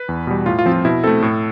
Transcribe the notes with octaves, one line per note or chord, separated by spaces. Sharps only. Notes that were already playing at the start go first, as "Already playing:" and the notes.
Already playing: B4
E2
B2 G3
A2 F4
F4
F3 C4
F4
B2 E4
A3 C4 A4
A2